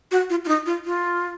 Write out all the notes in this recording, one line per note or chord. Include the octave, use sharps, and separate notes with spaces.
F#4
F4
F4
D#4
F4
F4